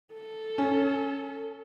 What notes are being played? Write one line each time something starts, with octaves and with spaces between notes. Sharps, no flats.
A4
C#4